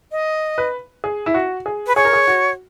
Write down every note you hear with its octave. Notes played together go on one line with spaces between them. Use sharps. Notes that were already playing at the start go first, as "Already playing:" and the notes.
D#5
B4
G#4
E4
F#4
G#4
B4
G#4 C#5
A#4
G#4
F#4